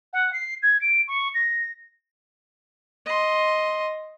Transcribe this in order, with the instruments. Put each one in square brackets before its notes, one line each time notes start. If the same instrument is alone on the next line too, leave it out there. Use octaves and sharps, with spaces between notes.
[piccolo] F#5
C7
G#6
D7
C#6
A#6
[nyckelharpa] D#5 C6